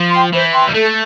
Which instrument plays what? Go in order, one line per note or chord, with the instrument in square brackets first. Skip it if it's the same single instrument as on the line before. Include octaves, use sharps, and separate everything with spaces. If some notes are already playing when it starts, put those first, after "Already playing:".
Already playing: [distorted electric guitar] F3
[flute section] G5 C6
[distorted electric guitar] E3 [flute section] C5
[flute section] G5 C6
[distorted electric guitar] G3
[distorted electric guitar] A3 [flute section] A4